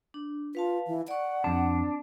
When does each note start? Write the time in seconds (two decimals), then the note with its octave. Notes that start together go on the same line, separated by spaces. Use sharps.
0.14 D4
0.55 F4 B4 F5 A5
0.87 E3
1.08 D5 F#5 C#6
1.44 F2 C4 D4 A5